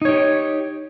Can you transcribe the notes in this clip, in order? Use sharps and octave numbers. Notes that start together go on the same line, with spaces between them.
D#4 G4 C#5